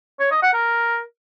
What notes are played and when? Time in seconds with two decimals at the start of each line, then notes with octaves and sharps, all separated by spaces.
0.20 C#5
0.31 D#5
0.43 F#5
0.54 A#4